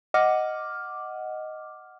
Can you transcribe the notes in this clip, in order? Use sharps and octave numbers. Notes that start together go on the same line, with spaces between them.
D#5 F#5 D6 F6